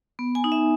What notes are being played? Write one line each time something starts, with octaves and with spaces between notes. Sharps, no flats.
B3
G#5
D#4
E5